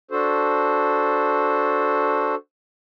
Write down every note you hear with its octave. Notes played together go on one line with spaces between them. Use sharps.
D4 F#4 A4 C5